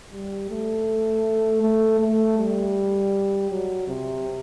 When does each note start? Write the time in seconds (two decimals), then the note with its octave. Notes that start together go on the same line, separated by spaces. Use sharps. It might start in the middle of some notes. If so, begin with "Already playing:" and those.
0.12 G3
0.49 A3
1.62 A3
2.00 A3
2.38 G3
3.50 F#3
3.88 C3